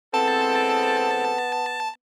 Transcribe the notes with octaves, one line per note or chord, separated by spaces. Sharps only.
E3 G#3 B3 C4 A4 A5